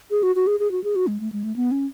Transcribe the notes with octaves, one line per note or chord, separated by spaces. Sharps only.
G#4
F#4
F#4
G#4
G#4
F#4
G#4
F#4
G#3
A3
G#3
A3
B3
C#4